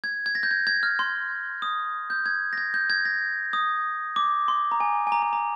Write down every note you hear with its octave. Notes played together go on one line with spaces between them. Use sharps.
G#6
G#6
A#6
G6
G#6
G#6
F6
C6
D#6
G6
G#6
A#6
G#6
G6
G#6
A#6
D#6
D6
C6
A#5
G#5
G#5
A#5
A#5
A#5